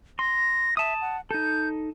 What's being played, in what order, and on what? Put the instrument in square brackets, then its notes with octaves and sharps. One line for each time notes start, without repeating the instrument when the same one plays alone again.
[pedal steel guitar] C6 [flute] A#6
[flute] E5 [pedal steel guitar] A5 D#6
[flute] F#5
[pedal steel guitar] D#4 A4 [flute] G6